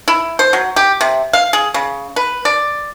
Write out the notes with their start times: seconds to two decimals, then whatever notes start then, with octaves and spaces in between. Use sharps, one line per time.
0.08 E4
0.39 C5
0.53 F#3
0.76 G4
1.01 C3
1.33 F5
1.53 G#4
1.74 C#3
2.16 B4
2.45 D5